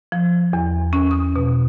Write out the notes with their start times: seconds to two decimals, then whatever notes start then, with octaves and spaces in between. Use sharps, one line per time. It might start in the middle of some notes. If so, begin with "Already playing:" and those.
0.12 F3
0.53 E2
0.93 C#4
1.11 D#6
1.36 B2